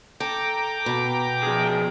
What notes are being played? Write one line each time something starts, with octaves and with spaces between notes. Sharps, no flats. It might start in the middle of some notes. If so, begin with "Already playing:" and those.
A4 G5 A#5 D6
B2
F3 G#4